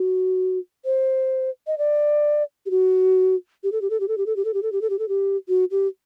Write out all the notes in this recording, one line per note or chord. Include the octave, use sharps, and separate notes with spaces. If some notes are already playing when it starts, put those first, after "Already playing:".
Already playing: F#4
C5
D#5
D5
G4
F#4
G4
A4
G4
A4
G4
A4
G4
A4
G4
A4
G4
A4
G4
A4
G4
A4
G4
F#4
G4